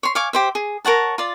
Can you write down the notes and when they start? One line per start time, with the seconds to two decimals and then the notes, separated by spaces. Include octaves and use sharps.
0.03 C#5 C6
0.15 C#5 F5 G#5 D6
0.33 G4 C5 E5
0.55 G#4
0.85 A#4 C#5 F#5 A5
1.18 F4 D5